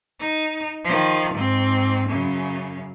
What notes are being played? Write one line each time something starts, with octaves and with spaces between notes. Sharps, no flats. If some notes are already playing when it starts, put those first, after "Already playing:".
D#4
D#3 F3
G#2 C4
F#2 C#3